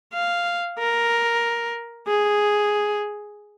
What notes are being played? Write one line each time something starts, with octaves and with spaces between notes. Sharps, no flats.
F5
A#4
G#4